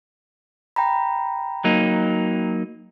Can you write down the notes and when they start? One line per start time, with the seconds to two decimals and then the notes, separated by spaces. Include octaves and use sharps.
0.76 G5 A#5 B5
1.64 F#3 A#3 D#4